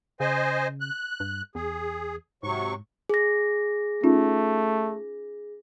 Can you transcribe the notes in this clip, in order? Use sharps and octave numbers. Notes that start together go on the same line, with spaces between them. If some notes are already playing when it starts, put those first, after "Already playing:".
C#3 C5 D#5 G#5
F#6
G2
E2 G#4
G#2 C3 F#3 C#6
G#4 A#6
A3 C#4 D#4 F4